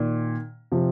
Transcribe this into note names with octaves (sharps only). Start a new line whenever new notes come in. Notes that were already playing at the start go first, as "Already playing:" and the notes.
Already playing: A#2 D#3
C3 F3